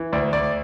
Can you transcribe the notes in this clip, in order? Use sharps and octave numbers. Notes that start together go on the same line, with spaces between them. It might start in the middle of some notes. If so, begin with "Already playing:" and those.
Already playing: E3
D2 D5
D2 D5